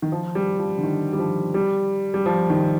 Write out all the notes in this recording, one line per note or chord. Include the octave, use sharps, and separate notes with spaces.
D#3
F3
G3
F3
D3
D#3
G3
F3
G3
G3
F3
D#3